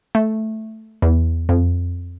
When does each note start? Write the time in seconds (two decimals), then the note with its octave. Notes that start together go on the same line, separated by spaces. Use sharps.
0.15 A3
1.02 E2
1.49 F2